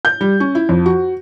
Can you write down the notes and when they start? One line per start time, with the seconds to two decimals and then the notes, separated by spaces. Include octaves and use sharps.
0.05 G6
0.21 G3
0.40 C#4
0.55 E4
0.69 F2
0.86 F#4